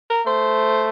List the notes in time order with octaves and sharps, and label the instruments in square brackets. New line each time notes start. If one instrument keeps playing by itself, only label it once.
[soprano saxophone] A#4
[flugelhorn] A3 [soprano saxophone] C5